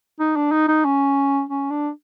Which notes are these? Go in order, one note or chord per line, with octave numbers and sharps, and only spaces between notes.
D#4
D4
D#4
D#4
C#4
C#4
D4